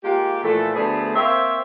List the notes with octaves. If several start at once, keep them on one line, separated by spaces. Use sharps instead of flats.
G#3 A#3 F4 G4
A#2 E3 F3 A3
D2 A3 B3 G#4 C5 D5
A#3 C4 C5 C#5 E5 F5